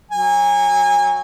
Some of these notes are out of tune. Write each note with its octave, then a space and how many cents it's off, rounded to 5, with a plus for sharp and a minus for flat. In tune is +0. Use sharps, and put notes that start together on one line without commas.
F#3 +0 G#5 -25